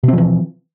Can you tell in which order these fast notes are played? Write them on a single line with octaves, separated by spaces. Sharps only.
B2 C4 F3 E3